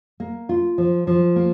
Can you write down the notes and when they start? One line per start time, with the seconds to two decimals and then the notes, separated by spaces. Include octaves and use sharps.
0.20 A#3
0.49 F4
0.78 F3
1.07 F3
1.36 A#3